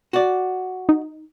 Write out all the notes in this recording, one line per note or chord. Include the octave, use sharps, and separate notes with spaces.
F#4 D5
D#4